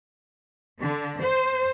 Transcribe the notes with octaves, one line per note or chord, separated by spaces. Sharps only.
D3
C5